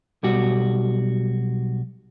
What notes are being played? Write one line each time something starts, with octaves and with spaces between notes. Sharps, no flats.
B1 G3 F#4